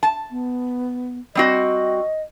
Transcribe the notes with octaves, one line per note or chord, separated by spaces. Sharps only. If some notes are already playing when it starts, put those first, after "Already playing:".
A5
B3
G3 C4 F#4 D#5